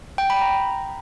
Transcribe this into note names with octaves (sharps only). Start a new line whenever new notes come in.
G5
B5
A#5